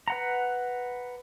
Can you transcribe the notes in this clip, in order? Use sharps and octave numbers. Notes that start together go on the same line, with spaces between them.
B4 F#5 A#5